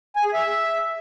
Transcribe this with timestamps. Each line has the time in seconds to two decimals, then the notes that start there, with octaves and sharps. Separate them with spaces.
0.16 G#5
0.25 G#4
0.33 E5